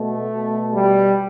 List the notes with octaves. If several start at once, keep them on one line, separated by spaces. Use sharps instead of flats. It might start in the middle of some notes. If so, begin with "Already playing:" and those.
Already playing: B2 A3
B2
G3